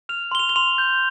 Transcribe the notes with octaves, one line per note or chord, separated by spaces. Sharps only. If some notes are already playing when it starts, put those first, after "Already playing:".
F6 F7
C6 G7
F7
G7
C6 F7
G6